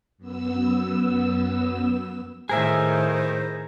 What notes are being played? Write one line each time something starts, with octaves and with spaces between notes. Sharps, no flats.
F#2 B3 E6
A2 D#3 G#4 A#4 C5 E5